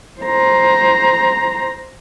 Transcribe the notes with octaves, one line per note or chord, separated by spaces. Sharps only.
C5 A#5